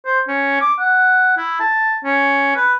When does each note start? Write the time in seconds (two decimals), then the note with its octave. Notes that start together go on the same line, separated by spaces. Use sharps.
0.06 C5
0.28 C#4
0.61 D6
0.79 F#5
1.38 E4
1.60 A5
2.04 C#4
2.56 B4